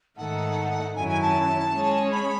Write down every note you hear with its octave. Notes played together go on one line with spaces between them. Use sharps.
G#2 D#3 A3 D#4 A4 F#5
F#2 D#3 F#3 C#4 E4 G#5
G#5
A5
G#3 C#4 G#4 C#5
B5